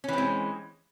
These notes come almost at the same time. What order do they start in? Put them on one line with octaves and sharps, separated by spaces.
C#4 E3 C4 G#3